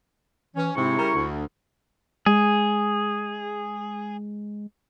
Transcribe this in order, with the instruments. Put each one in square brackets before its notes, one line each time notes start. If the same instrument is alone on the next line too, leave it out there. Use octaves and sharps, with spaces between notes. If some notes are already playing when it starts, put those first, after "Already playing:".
[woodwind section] E3 [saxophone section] C#4
[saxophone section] G#2 C3 [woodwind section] E4 C#6
[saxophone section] C#3 G3 A#4
D2
[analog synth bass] G#3 [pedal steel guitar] G#4